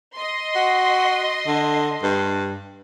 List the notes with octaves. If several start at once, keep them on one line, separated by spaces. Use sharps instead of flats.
D#5 C6
F#4
D3
G2